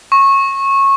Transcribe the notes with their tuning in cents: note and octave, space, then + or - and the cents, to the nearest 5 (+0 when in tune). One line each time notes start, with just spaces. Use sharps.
C#6 -20